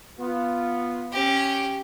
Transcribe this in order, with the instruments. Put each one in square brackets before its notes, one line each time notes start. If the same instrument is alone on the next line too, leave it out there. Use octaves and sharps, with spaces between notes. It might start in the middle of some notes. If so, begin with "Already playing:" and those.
[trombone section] B3 F4
[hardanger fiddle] C#4 G4